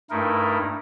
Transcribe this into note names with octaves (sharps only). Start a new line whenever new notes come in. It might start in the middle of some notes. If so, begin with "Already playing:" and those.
G2 A3 D#4 E4 A#4